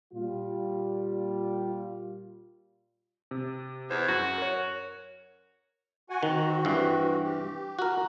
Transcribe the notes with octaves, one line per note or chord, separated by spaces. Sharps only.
A#2 G3 F4
C3
E2 C5
F#2 F#4
A#4 C#5
F#4 F#5 G#5
D#3 C4 F#4
G2 E3
G4
F#4 A#4